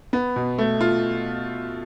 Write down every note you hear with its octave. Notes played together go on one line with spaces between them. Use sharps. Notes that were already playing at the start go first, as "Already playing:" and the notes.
B3
B2
A3
F4